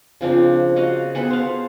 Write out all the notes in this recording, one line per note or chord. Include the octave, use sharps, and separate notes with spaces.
C#3 F3 C4 D4
F#4 D#5 F5
B3 G#4 A4 B4
C5 F5